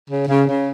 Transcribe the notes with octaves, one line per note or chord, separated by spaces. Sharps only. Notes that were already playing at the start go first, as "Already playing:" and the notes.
C#3
C#3
C#3